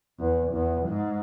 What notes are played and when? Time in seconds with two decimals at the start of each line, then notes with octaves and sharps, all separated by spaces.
0.20 E2
0.53 E2
0.88 G#2